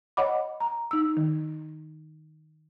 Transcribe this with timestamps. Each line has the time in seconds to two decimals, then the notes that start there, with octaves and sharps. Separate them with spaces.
0.17 C#5 D#5 F#5 B5 D6
0.60 A#5
0.91 D#4 E6
1.17 D#3